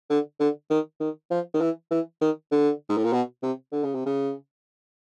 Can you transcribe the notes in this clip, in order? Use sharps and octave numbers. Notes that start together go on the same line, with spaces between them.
D3
D3
D#3
D#3
F3
D#3
E3
E3
D#3
D3
G#2
A2
A#2
B2
C3
D3
C#3
C3
C#3